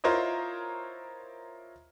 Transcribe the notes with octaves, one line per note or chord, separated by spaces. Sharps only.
E4 F4 A#4 C5 C#5 D#5